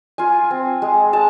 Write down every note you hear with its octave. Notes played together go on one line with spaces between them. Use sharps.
F4 G#5
C4
G#3
G#3 A5